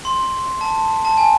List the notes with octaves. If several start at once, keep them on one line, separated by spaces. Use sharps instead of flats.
C6
A5
A5
G#5